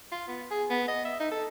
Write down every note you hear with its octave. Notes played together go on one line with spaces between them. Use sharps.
F4
B3
G#4
B3
D#5
E5
D#4
A4